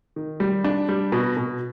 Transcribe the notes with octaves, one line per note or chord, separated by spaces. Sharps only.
D#3
G3
D4
G3
B2
B2